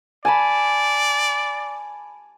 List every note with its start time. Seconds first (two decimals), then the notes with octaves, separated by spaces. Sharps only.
0.25 D5 G#5 A5 B5